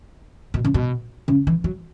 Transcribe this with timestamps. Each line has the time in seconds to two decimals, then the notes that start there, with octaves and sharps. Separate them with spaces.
0.54 B2
0.65 C#3
0.74 B2
1.28 C#3
1.47 E3
1.64 F#3